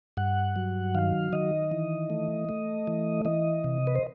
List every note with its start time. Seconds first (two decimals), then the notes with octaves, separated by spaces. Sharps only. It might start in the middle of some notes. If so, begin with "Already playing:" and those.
0.17 G2 F#5
0.56 F#3
0.95 D#3 F5
1.33 D#3 D#5
1.71 E3
2.10 A3
2.49 A3
2.87 E3
3.25 E3 D#5
3.64 C3
3.87 B4
3.96 C5